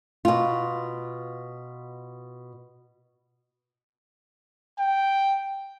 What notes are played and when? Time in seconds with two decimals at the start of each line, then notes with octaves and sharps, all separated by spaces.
0.25 B2 F4
4.79 G5